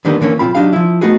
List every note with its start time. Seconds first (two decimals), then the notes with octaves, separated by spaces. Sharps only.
0.05 D3 D#3 G3 A#3 B3 D#4
0.21 D3 E3 A#3 C#4 C#5
0.39 B1 A#2 C4 F4 B5
0.55 F#3 D4 D#4 G4 F5
0.73 F3 E4
1.01 A3 B3 D#4 F#4 G#4